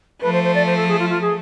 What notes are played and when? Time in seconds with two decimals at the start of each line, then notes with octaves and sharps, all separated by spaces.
0.22 F3 A3 B4
0.33 C5
0.44 C5
0.55 D5
0.66 C5
0.77 A4
0.88 G#4
0.99 F4
1.09 F4
1.21 G#4